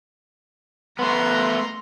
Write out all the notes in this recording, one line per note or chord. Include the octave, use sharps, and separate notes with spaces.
A3 B3 A#5 C6